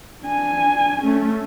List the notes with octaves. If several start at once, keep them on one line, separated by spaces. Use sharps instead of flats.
D4 G#5
A3 C#4